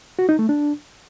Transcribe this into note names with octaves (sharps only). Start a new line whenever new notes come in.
F#4
D#4
A3
D4